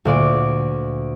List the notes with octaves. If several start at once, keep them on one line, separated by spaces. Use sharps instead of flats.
D2 A#2 D5 D7